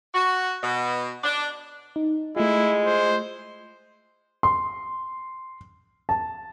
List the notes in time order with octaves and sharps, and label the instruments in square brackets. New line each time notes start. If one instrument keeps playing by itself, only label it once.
[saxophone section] F#4
B2
D4
[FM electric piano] D#4
[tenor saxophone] G#3 [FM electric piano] A3 F4 [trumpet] E4
[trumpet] C5
[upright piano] C6
A5